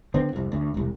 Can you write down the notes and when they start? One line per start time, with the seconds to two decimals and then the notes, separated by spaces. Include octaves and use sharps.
0.14 D3 B3 C4
0.33 C2 F2
0.52 D2
0.74 E1 C2